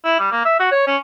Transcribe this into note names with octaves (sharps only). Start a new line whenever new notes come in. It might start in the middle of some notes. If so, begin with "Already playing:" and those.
E4
G3
A#3
E5
F#4
C#5
C#4